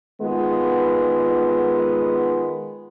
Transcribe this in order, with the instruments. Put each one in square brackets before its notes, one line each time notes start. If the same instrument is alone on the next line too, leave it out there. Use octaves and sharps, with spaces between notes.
[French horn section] D#3 G#3 B3 F4